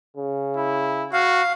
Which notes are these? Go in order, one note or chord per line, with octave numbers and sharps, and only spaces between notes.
C#3
E4
F#4 F5